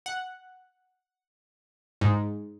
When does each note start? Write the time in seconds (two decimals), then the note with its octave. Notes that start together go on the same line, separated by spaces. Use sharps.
0.06 F#5
2.01 G#2